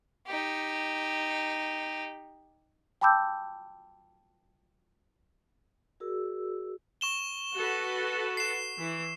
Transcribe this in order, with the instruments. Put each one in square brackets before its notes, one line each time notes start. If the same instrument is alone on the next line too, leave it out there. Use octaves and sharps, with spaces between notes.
[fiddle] D#4 G4
[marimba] G5 A5 B5 D6 E6 G6
[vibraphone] F#4 G#4 A#4 D5 E6
[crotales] C#6 E7 G7
[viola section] F#4 A4 B4
[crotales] C7 E7
[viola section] E3